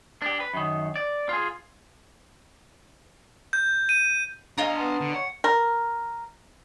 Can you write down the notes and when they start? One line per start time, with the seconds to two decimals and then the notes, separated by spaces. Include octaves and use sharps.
0.22 D4 G4
0.40 B4
0.54 F#2 D#3
0.96 D5
1.29 F4 G#4
3.53 G6
3.89 D#7
4.58 D4 D#5 F5 G#5 A#5
4.77 B3 A5 C6
5.01 D3
5.14 C#5 F#5
5.44 A#4